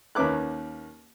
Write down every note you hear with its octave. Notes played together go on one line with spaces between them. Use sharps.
D#2 A#3 C#4 B4 D6 F#6